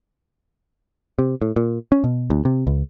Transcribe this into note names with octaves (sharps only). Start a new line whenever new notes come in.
C3
A2
A#2
C#4
B2
D2
C3
C#2